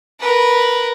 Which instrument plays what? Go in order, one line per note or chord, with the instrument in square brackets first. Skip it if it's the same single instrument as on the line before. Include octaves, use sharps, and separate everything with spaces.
[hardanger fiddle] A#4 B4